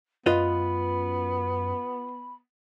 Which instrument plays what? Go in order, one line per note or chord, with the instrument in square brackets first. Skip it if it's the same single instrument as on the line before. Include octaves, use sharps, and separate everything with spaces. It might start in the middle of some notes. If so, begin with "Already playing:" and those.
[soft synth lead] F#2 [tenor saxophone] B3 [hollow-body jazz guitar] F4 B4 D#5 [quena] B5